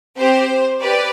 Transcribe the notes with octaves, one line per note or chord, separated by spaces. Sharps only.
C4 G4 C5
G4 B4 D5